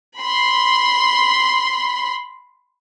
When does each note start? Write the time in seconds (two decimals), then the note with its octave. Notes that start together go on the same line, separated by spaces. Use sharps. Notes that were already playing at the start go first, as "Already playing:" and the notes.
0.18 B5 C6